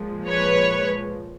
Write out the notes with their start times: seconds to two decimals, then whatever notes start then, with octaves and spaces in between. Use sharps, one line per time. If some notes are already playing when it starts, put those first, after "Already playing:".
Already playing: A#2 F3 G#3
0.28 B4 C#5